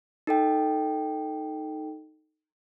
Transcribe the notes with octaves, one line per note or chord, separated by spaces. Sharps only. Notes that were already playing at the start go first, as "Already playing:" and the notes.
D#4 A4 G5